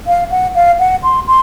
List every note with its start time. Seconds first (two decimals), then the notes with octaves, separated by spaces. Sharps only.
0.07 F5
0.31 F#5
0.55 F5
0.79 F#5
1.03 C6
1.27 C6